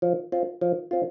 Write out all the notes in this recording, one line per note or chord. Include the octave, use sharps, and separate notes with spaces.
F3
C4 F4
F3
C4 F4